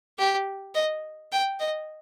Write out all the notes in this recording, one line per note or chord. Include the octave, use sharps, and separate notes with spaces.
G4
D#5
G5
D#5